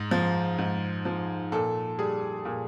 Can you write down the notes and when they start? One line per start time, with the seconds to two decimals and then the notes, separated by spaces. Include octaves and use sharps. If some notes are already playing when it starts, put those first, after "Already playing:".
Already playing: G#2
0.11 F3
0.58 G#2
1.05 F3
1.52 A#2 A4
1.98 G3 G#4
2.45 A#2